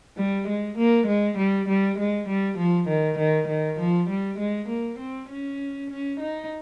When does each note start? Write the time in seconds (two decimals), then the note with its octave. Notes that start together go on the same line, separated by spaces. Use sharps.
0.17 G3
0.47 G#3
0.77 A#3
1.06 G#3
1.37 G3
1.68 G3
1.98 G#3
2.28 G3
2.57 F3
2.88 D#3
3.18 D#3
3.48 D#3
3.78 F3
4.09 G3
4.38 G#3
4.68 A#3
4.98 C4
5.29 C#4
5.90 C#4
6.19 D#4